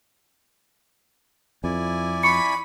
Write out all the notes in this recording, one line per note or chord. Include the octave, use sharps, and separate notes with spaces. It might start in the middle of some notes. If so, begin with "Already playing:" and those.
F2 E4 D5 G#5
B5 C#6 C#7